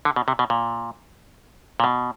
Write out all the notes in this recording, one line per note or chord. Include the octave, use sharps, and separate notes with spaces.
D3
B2
C3
B2
A#2
A#2
B2